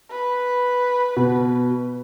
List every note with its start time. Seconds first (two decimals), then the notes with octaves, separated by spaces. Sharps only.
0.10 B4
1.16 B2